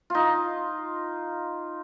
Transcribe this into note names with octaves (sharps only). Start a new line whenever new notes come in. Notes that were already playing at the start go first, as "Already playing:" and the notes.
D#4 F4